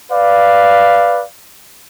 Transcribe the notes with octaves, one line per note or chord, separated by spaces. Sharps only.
B4 D5 F5